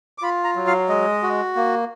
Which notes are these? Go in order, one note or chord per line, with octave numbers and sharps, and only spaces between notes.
D6
F4 B5
A#5
F#3
F5
G#3 D#5
F#4
A#3